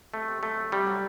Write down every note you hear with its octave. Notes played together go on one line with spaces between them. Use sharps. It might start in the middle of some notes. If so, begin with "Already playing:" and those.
C3 A3
C3
F#3 A3
C3
C3 G3
F#3